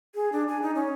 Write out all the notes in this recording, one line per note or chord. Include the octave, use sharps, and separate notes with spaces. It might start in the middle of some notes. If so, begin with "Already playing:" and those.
G#4
D4
G#5
D#4
C#4